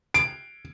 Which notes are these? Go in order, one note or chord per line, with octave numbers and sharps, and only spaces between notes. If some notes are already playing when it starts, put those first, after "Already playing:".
D7